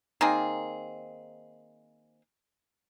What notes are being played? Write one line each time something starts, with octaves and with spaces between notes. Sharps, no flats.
D#3 A#3 C4 G#4